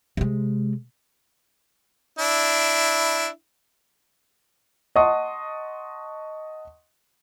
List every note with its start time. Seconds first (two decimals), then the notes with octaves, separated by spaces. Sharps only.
0.17 C3 G#3
2.19 D4 E4
4.96 D#5 F#5 A5 C6 C#6 D#6